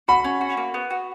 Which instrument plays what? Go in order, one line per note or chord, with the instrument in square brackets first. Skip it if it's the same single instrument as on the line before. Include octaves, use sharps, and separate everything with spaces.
[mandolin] F#4 [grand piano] B5
[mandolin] C#4
F#4
A#3
B3
F#4